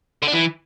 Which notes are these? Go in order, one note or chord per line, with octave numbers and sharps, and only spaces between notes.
D3
D4
E3